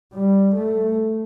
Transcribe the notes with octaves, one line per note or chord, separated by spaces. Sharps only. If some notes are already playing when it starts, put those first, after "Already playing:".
G3
A3